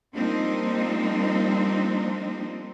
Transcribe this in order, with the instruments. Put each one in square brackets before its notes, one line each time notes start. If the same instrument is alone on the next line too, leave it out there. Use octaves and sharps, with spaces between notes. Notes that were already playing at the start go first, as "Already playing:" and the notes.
[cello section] F3 G3 A#3 C4 D4 D#4